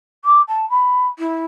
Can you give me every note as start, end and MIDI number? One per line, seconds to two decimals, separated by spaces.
0.24 0.41 86
0.48 0.68 81
0.70 1.07 83
1.19 1.45 64